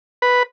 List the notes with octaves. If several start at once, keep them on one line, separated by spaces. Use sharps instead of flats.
B4